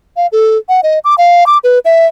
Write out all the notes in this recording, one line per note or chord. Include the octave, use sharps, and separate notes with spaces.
F5
A4
F#5
D#5
D6
F5
D6
B4
E5